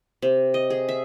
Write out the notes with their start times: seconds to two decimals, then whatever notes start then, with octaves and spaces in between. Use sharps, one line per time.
0.22 C3
0.54 D#5
0.70 G#4
0.89 E5